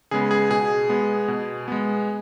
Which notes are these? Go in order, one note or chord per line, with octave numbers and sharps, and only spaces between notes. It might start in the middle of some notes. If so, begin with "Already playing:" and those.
C#3 G#3 B3 G#4
G#4
B2 G#4
G#3 B3
B2
G#3 B3